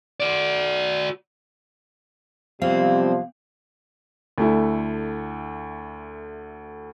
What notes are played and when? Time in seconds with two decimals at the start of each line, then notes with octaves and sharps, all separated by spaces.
0.20 F#4 D5
2.62 F#2 C3 F3 G3 B3 C4 F5
4.38 D2 A3 E4